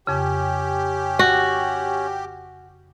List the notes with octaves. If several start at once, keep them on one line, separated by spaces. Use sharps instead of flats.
F2 C#3 C#4 G4
F#4